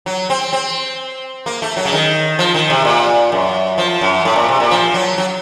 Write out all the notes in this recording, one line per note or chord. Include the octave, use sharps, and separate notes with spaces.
F#3
C4
C4
A#3
A3
F#3
C#3
D#3
F3
D#3
C3
A#2
F#2
F3
F#2
A2
A#2
C3
A#2
F3
F#3
F#3